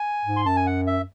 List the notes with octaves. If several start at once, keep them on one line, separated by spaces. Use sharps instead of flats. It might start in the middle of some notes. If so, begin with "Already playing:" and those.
Already playing: G#5
G#2
C6
F#2 A5
G#5
F#5
E5